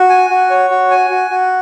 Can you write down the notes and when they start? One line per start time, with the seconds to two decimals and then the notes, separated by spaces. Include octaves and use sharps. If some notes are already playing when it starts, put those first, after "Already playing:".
Already playing: F#4
0.10 G#5
0.30 F#4
0.50 C#5
0.70 F#4
0.91 G#5
1.10 F#4
1.30 F#4